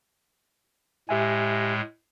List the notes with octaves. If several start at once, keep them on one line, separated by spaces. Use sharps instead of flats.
A2 G#3 G4 E5 G#5